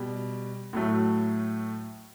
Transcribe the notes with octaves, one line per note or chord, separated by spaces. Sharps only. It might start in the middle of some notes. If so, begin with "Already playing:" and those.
Already playing: B2 G3
A2 F#3 A3